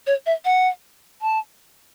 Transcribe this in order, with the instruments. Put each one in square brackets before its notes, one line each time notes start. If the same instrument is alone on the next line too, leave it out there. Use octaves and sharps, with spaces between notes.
[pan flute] C#5
E5
F#5
A5